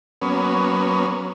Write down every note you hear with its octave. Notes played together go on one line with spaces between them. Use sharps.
F#3 A#3 B3 C#4